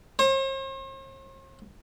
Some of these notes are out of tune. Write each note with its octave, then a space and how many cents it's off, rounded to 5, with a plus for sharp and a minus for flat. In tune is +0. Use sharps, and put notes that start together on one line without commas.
C5 +45